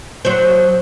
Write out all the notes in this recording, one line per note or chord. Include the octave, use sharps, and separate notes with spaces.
F#3 C5